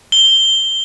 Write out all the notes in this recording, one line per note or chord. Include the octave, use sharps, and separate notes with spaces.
G7